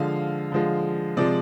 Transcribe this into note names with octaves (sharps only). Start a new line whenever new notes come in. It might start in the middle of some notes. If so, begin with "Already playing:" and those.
Already playing: D3 F3 G#3 F5
D3 F3 G#3
C3 F3 G#3 D5